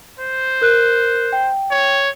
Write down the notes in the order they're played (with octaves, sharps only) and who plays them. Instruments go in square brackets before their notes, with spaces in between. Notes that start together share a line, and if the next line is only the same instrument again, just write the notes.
[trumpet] C5
[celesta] A#4 F#6
G5
[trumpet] C#5